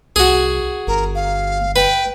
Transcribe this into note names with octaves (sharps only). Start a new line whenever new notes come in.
C2 F#4 G#4
G1 A#4
F5
B4 G5